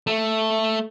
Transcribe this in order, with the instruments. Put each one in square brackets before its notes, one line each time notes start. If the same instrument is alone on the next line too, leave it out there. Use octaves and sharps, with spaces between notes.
[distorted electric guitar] A3